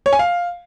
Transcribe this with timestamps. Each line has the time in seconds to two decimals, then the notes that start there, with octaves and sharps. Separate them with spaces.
0.06 C#5
0.13 G#5
0.19 F5